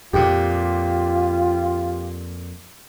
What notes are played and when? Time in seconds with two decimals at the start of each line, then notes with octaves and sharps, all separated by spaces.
0.13 F2 A#2 F4 G4